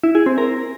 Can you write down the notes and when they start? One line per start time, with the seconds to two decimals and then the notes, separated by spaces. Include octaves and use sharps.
0.03 E4
0.15 G#4
0.26 C4
0.38 A#4